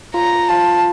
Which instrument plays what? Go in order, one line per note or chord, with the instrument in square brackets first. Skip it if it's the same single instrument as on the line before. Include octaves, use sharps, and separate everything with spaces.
[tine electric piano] F4 [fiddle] A#5
[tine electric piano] F4 [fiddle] A5